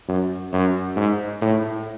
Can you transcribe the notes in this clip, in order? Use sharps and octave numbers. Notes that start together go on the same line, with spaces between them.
F#2
F#2
G#2
A2